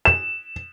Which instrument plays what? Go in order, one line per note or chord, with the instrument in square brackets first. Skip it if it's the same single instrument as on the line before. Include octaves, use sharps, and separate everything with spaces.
[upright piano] E7